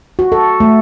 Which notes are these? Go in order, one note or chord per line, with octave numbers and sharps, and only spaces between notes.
F#4
A4
A3